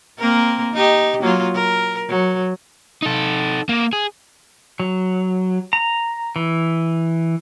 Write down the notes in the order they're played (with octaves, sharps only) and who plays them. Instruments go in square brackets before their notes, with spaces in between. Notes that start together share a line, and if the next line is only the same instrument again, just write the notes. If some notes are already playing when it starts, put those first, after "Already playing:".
[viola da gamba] A#3 C4 A#4
D#4 G4
F#3 A#3 F4
A#4
F#3
[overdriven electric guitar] D#4 A4
A#3
G#4
[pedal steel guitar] F#3
A#5
E3